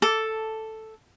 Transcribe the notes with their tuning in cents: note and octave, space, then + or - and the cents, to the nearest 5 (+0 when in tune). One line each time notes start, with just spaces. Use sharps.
A4 +0 D6 -15